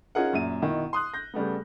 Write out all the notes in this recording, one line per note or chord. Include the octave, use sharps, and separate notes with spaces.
C#4 D#4 F4 G#4 A#4 F#5
F#2 A#2 E5 D#7
B2 D#3 E4
C6 D#6 F#6
G6 A#6
C#3 G3 A3 B3